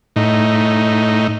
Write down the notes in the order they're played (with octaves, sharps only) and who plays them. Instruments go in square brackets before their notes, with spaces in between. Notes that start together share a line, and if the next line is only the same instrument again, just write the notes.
[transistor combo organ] A2 D#4